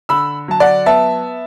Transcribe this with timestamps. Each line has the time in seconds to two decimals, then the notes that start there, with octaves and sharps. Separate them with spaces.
0.09 D3 B5 E6
0.48 F#3 A5
0.60 D5 F#5
0.86 B3 E5 A5